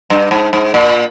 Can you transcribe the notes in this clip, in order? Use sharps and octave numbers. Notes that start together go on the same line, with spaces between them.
G2
G#2
G#2
A#2